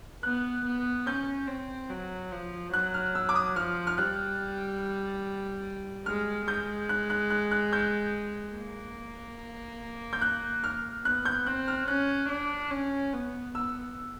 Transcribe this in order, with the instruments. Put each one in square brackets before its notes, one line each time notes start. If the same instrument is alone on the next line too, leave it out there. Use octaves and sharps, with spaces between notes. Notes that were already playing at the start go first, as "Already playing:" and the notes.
[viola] B3 [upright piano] F#6
[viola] B3
[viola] C#4 [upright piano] G6
[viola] C4
F#3
F3
[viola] F#3 [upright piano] F#6
[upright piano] F6
E6
D6
D#6
[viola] F3 [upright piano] F6
[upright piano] F6
[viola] G3 [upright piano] F#6
[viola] G#3 [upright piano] F6
[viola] G#3 [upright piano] G6
[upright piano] F#6
F#6
F#6
F#6
G6
[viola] A#3
[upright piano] G6
F#6
F6
[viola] B3 [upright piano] F#6
[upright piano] G6
[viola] C4 [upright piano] F#6
[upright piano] F6
[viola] C#4 [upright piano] F#6
[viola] D4
C#4
B3
[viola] B3 [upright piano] E6